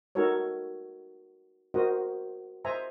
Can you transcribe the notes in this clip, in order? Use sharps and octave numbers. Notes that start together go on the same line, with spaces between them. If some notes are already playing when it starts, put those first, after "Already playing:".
D#4 F#4 A4 A#4 C#5
F#4 A#4 C5 D#5
C5 D#5 E5 G#5 A#5